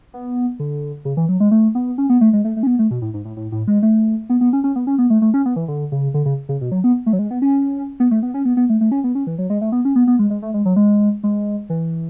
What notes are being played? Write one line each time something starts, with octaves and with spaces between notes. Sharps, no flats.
B3
D3
C#3
E3
F#3
G#3
A3
B3
C#4
B3
A3
G#3
A3
A3
C#4
B3
A3
B2
A2
G#2
A2
A2
A2
G#3
A3
B3
B3
C#4
C#4
B3
C#4
B3
A3
A3
C#4
B3
E3
D3
C#3
D3
C#3
C#3
B2
F#3
B3
A3
F#3
G#3
B3
C#4
B3
A3
B3
C#4
B3
B3
A3
A3
C#4
B3
C#4
E3
F#3
G#3
A3
B3
C#4
B3
B3
G#3
G#3
A3
G#3
F#3
G#3
G#3
E3